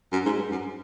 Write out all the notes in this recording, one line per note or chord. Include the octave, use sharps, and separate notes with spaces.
F#2
G#2
G2
F#2